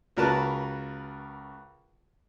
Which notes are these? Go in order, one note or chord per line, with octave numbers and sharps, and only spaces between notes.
C#2 F#4 A#4 B4 A5 F#6